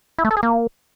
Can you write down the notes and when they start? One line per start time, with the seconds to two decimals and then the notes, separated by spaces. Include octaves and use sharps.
0.18 E4
0.25 A3
0.31 A4
0.37 G#4
0.43 A#3